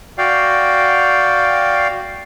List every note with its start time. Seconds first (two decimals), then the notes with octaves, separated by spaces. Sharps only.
0.18 F#4 D5 F5 G5